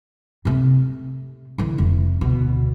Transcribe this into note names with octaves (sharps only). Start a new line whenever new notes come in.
C3 A3
D3 E3
F1 A3
D2 B2